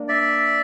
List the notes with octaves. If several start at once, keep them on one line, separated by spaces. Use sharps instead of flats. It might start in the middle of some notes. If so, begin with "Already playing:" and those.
Already playing: A#3 D4
D5 E5